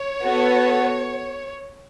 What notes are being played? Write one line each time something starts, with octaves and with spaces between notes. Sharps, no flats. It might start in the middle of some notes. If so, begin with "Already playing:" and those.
Already playing: C#5
B3 F#4 A4